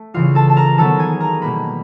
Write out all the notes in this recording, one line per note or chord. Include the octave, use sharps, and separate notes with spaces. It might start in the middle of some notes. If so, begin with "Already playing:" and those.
Already playing: A3
C#3 E3 G3 F4 F5
A4 A5
A5
A#4 A#5
D#3 F#3 B3 A4 A5
G#4 G#5
A#4 A#5
B2 G3 A#3 B4 B5